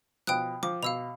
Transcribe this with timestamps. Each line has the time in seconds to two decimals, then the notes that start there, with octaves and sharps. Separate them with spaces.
0.27 B2 F3 G5 D#6 F#6
0.63 F3 D6
0.83 B2 F5 E6 F7